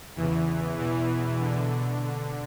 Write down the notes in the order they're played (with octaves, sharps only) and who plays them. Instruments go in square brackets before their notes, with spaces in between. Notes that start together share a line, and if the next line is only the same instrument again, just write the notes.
[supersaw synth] E2 E3 [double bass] C#3
[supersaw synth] E2 E3 [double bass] B2
[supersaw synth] D3